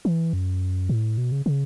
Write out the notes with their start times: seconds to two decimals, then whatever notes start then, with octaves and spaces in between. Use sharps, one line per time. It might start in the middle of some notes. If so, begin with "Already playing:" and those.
0.05 E3
0.33 F#2
0.89 A2
1.18 B2
1.32 C#3
1.46 C#3